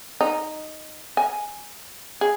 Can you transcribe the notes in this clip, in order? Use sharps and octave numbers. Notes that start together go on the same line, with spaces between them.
D#4
G#5
G#4